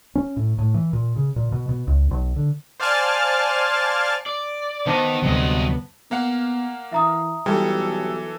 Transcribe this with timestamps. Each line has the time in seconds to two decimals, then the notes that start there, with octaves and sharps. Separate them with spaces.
0.15 C#4
0.36 A2
0.59 A2
0.74 E3
0.93 A#2
1.16 C#3
1.36 A#2
1.52 B2
1.69 B2
1.87 C#2
2.11 B1
2.36 D3
2.80 C5 D5 F5 G#5 A5 F6
4.26 D5
4.86 D#3 B3 C5 D#5 A5 D6
5.23 D2 G2 C3 F#3 D#5
6.11 A#3 B3 F5 F#5
6.92 E3 E5 A#5 D#6
7.46 B1 E3 G3 A4